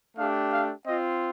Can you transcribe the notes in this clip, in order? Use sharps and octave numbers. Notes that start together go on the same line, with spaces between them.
A3 D4 G4 F5
F5
C4 F4 D#5